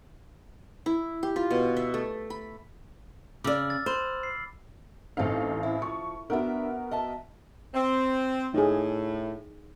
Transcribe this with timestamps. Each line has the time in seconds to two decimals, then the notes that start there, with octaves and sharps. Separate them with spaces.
0.86 E4
1.23 G4
1.36 F4
1.50 B2
1.77 E5
1.94 A3
2.30 B5
3.44 C#3 D5 D6 E6 F6
3.70 A6
3.86 C5 B5 F#7
4.23 C7
5.17 A1 A3 C4 D#4 F5
5.63 E4
5.82 F3 C#6
6.30 B3 D4 F#4 A#4 E5
6.91 D#5 E5 A5
7.74 C4
8.54 A2 D#4 G#4